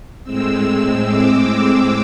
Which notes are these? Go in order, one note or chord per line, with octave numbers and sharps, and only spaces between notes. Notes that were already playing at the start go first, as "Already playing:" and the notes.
A2 G#3 C4 E6
D6